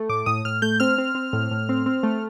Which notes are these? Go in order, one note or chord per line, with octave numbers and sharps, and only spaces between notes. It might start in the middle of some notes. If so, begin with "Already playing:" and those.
Already playing: A3
A2 D6
A2 D#6
A2 F6
A3 G6
C4 F6
C4
C4
A2
A2
C4
C4
A3